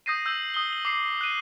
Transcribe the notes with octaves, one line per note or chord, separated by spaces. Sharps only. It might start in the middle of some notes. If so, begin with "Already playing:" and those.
D#6 G6 A#6 C7 D#7
E6 G6 A#6 D#7 F#7
D#6 G7
F#7
D6 C7
F#6 D#7